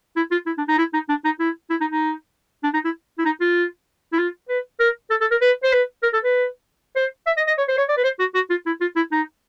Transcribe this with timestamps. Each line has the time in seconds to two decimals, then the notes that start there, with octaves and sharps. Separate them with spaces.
0.16 E4
0.31 F4
0.46 E4
0.58 D4
0.68 D#4
0.78 E4
0.93 D#4
1.09 D4
1.25 D#4
1.40 E4
1.70 E4
1.81 D#4
1.91 D#4
2.63 D4
2.73 D#4
2.84 E4
3.18 E4
3.25 D#4
3.41 F4
4.13 E4
4.18 F4
4.49 B4
4.80 A#4
5.10 A4
5.21 A4
5.31 A#4
5.41 B4
5.63 C5
5.73 B4
6.03 A#4
6.13 A4
6.24 B4
6.96 C5
7.26 E5
7.37 D#5
7.47 D#5
7.58 C#5
7.68 C5
7.78 C#5
7.89 D5
7.97 B4
8.04 C5
8.19 F#4
8.34 F#4
8.50 F4
8.66 E4
8.81 F4
8.96 E4
9.12 D#4